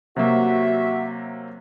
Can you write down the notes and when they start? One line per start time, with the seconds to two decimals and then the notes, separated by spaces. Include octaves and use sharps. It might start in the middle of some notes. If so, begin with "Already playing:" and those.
0.16 C3 F#3 A#3 F#4 E5